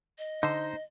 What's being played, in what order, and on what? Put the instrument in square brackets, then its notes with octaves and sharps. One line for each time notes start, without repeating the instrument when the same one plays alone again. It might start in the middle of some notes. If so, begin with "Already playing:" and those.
[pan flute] D#5
[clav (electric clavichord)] D3 [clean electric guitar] D#4 C5